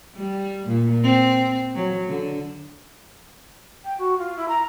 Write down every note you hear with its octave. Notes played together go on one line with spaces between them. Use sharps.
G3
A#2
C4
F#3
D3
G5
F#4
F4
E4
A#5